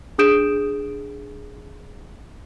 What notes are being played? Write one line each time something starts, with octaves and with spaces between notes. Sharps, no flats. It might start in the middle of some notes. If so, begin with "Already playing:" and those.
D4 G#4 D#6 G6 D7 E7